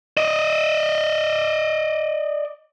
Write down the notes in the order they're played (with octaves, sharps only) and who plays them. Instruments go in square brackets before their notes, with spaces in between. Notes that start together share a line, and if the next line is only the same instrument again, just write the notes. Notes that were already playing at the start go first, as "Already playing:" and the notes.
[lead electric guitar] D5 D#5